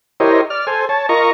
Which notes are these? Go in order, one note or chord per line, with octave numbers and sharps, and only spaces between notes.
E4 G4 A#4 C5 C#5 D#5
D5 F6
A4 C5 G#5
C#5 A5
F4 A#4 D#5 A#5 C#6